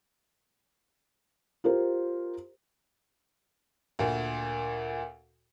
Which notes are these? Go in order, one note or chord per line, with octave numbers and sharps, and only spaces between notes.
F4 G4 A#4 C5
D2 A#2